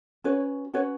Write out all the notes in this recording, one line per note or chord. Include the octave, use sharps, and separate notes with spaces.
C#4 F#4 B4 C#5
C#4 F#4 B4 C#5